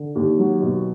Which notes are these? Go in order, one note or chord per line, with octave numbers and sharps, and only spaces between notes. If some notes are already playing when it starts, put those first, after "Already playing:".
Already playing: D3
D#2
F#3
B2